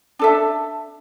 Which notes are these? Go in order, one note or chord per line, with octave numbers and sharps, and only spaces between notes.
D4 A4 E5